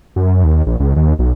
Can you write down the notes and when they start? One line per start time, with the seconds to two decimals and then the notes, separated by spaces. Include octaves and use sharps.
0.16 F#2
0.44 D#2
0.67 A#1
0.80 C#2
0.96 D#2
1.19 B1